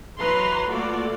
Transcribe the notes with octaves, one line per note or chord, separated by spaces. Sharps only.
E3 F#3 B4 A#5 C6
A3 A#3 F4 F#4 A4 D5